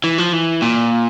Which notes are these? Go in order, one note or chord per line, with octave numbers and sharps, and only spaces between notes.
E3
F3
E3
A#2